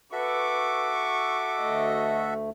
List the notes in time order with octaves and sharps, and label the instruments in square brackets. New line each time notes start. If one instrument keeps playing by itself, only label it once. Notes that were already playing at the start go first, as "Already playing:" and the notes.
[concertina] F#4 A4 E5 [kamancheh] B4 C#6 [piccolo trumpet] D6
[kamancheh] C#6
[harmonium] D2 A3 [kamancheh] D#5